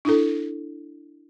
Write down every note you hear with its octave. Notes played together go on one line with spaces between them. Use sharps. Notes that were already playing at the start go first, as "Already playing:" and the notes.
D4 E4 A4